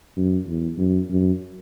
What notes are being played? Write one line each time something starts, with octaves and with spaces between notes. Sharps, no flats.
F#2
E2
F#2
F#2